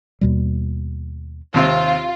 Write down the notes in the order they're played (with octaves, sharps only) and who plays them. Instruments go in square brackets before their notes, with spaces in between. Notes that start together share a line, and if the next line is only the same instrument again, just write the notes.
[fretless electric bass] D#2 B2 G3
[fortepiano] D#2 C3 C4 [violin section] F4